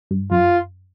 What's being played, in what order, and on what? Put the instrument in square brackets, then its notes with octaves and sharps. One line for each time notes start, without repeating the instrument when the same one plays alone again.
[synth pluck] G2
[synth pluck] F#2 [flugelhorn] F4